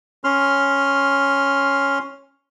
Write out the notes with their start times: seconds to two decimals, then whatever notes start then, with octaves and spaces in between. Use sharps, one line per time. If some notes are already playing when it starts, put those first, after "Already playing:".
0.24 C#4 C6 F6